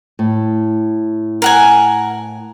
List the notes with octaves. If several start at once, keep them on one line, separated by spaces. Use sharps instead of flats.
A2
A#4 F#5 G#5